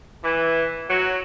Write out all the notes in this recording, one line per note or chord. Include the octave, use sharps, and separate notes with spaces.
E3
F#3